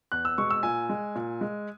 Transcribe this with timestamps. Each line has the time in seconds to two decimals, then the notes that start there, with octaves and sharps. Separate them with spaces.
0.12 E2 F#6
0.25 E6
0.38 B2 G#3 C#6
0.50 E6
0.63 A#2 G#5
0.90 G#3
1.15 A#2
1.41 G#3